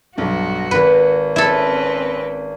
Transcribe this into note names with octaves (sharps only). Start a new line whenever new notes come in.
B1 G2 F#4
G#1 B4 B5
C4 C#4 E4 A4 B4